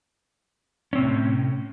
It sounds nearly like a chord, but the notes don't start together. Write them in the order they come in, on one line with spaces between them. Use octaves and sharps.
C#4 C4 C3 A2